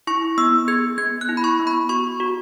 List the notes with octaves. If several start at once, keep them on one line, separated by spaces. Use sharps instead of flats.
E4 C#6
B3 E6
G#4 G#6
B3 G#6
F#6
E4
B5
C#6
B3
B5
F#4 C#6
F#4